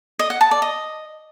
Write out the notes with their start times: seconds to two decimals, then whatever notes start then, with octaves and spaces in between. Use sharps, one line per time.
0.19 D#5
0.30 F#5
0.41 A5
0.51 D5
0.62 D#5